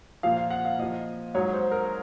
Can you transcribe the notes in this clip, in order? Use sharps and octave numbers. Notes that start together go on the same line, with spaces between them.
A#2 F3 F5
F5
F#5
F5
A#2 F3 D#5
G#2 F#3 C#5
C5
A#4